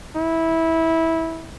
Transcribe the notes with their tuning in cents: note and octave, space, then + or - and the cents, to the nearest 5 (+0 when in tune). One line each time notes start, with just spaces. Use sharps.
E4 -15